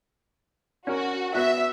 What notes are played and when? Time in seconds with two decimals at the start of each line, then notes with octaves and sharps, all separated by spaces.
0.87 C#4 F#4 A#4
1.35 B3 F#4 E5